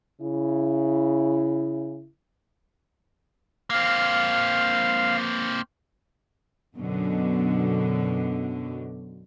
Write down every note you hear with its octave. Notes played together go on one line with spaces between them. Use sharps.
C#3 E4
A#3 C4 F5
F#2 B2 D3